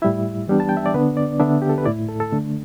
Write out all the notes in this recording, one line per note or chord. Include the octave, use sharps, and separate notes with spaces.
A2 G3 E4 E5
E3 G3 B3 D4
A5
G5
E5
D5
D3 B3 D4 B4
D5
D3 B3 D4 E5
G4
A4
B4
A2 A3 E4 D5
A4
A4
D3 A3 D4